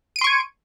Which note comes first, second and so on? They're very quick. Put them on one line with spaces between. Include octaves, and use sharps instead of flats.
D#7 D7 C6 C#6 G#6